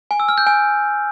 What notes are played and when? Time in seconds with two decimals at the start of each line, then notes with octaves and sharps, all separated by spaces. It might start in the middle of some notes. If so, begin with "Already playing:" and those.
0.11 G#5
0.20 E6
0.29 F6
0.38 G6
0.47 G#5